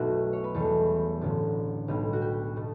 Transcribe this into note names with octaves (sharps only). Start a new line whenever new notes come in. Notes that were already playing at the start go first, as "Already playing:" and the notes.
Already playing: F#1 B1 B2 F#3 A3 E4 F#4
C#5
B4
E2 B2 G3 A4
A1 G2 D3 F#3 A4
B1 A2 G3
F#4
G4
B2 A3